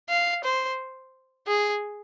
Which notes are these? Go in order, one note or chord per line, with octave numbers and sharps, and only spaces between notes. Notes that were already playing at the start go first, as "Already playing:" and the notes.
F5
C5
G#4